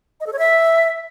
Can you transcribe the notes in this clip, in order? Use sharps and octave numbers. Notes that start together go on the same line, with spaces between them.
D#5
A4
C#5
E5